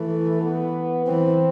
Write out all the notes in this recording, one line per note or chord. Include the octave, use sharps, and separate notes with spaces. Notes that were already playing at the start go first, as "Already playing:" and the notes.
Already playing: E3 A3
B3
E3 C4